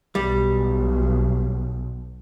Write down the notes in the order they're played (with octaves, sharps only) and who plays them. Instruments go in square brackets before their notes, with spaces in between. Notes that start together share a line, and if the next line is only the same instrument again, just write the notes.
[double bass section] B1 [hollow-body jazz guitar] G3